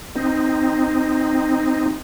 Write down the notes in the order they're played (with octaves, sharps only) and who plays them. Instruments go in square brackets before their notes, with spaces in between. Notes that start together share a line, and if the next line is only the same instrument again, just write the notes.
[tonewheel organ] C4 D#4